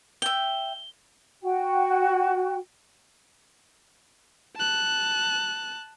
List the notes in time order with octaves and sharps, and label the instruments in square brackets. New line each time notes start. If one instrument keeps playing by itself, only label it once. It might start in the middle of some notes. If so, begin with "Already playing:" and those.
[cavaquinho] E5 G5 [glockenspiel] G7
[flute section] F#4 G5
[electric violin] A5 F#6